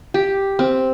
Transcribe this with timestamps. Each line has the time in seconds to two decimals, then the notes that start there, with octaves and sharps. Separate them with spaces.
0.14 G4
0.59 C4